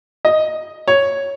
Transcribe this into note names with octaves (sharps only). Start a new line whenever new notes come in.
D#5
C#5